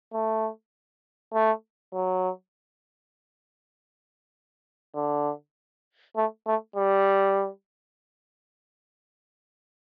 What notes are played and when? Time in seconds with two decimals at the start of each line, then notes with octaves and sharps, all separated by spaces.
0.13 A3
1.33 A3
1.93 F#3
4.95 D3
6.16 A3
6.46 A3
6.76 G3